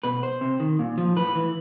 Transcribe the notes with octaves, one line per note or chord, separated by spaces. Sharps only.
B2 B4
C5
C3
D#3
A#2
F3
A2 B4
E3